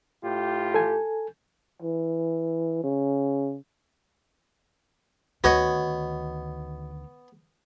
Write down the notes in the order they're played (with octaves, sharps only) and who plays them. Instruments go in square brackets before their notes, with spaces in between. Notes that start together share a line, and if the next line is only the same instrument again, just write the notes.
[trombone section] A2 F4 G4
[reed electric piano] A4 G#5
[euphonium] E3
C#3
[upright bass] D2 D#3 [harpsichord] B3 C#5 [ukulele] F#4 D#5